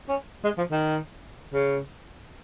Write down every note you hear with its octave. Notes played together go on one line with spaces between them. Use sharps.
C#4
G#3
F3
D#3
C#3